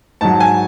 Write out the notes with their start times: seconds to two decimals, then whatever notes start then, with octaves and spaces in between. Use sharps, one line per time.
0.21 G#2 F#3 A5
0.40 G#5